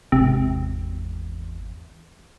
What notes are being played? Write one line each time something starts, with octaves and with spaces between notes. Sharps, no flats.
G#1 E2 C3